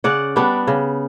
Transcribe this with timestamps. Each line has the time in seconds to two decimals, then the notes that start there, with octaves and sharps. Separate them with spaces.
0.04 C#3 D5 F#5
0.36 G3 B3 D4
0.67 C#3